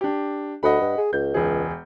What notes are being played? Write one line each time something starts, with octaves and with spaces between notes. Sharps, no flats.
D4 G4
D2 D#5 F#5 B5
G2
G#4
C#2 G6
E1 G#4